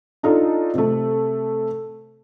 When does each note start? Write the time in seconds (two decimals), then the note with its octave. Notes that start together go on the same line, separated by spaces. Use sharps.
0.23 D4 D#4 F4 A4 D#5
0.74 C3 A3